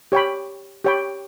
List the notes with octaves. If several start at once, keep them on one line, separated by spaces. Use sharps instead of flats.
G4 C#5 G5 B5
G4 C#5 G5 B5